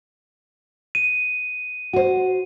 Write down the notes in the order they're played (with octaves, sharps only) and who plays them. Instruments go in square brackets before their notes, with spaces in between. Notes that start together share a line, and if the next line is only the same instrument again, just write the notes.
[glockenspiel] D#7
[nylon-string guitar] F#4 C5